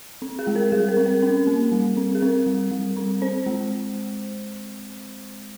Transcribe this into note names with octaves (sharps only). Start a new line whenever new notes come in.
C4
G#4
G#3
A#4
G3 G#4
A#4
C4
A#4
C#4 A#4
A#3
G3
C4
G#4
C4 A#4
G3
G3
C4
C4 C5
G#3